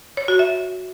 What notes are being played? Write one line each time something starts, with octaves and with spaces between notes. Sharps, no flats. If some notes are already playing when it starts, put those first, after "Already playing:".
C#5
F#4
E5